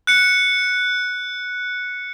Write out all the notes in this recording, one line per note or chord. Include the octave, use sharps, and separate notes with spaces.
F#6 C#7